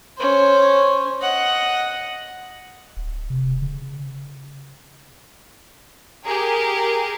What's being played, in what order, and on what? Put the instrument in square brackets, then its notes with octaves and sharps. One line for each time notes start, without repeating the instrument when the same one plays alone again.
[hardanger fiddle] C#4 C5
D#5 F#5
[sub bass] D1
C3
C#3
[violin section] G4 G#4 A#4